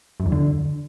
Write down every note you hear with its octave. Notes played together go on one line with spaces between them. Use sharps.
F#2
E2
D3